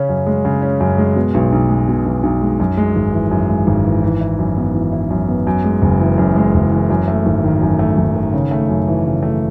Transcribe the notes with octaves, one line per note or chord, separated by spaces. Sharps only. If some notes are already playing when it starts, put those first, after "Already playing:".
Already playing: C#3 C#4
F#2
G#3
C#3
C#4
F#2
G#3
B2
B1
B1
G#3
B2
B1
B1
G#3
F#2
G#3
G#1
E3
F#2
G#3
G#1
E3
E3
E4
F#2
B3
E3
E4
F#2
B3
F#2
G#3
F#1
E3
F#2
G#3
F#1
E3
F#2
A3
G#1
D#3
F#2
A3
G#1
D#3
C#3
A3
F#2
E3
C#3
A3